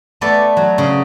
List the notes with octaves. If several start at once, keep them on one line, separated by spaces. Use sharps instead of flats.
A3 B3 A4 D5
F#3
C#3